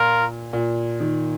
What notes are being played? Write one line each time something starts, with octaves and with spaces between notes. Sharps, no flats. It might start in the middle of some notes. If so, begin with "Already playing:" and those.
Already playing: A#2 F4 A#4
A#2
D#3